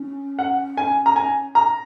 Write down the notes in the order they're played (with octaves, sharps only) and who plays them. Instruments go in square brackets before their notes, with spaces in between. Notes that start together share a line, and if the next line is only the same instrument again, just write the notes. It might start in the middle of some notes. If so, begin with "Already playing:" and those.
Already playing: [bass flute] C#4
[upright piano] F#5
G#5
A#5
G#5
A#5